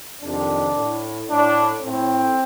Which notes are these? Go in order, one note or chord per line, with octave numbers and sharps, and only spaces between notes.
F2 C3 D#3 D4
A2
A2 D4
A2 C4